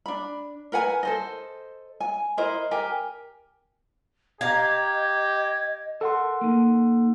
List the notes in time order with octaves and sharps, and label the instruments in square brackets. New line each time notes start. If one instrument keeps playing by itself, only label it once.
[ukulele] D4 B5
A#4 B4 F#5 G#5
A4 C5 D#5
G#5
E4 A#4 C5 D#5
G4 A#4 G#5
[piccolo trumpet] G4 [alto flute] D#5 [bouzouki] F5 A#5 [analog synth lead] G#6
[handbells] A4 F#5 C6 [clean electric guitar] A#4 A5
[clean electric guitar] A#3 D#4